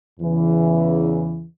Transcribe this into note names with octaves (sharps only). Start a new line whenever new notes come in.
E2 C#3 E3